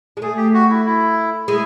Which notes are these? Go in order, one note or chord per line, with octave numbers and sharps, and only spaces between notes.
G#3
A3 G#4
G4
F#4
E4
E4
G#3 E4